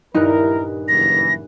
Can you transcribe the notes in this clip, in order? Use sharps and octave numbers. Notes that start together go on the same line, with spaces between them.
D#1 G2 D#4 E4 A#4 F#6
F#1 E3 A#6